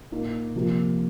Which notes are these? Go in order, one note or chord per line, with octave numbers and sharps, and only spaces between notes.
A#2 A#3 D#4
C3 F3 A#3